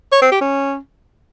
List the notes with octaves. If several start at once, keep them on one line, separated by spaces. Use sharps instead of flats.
C#5
C4
G4
C#4